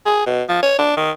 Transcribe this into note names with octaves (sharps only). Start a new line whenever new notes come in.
G#4
B2
F3
C#5
D4
D#3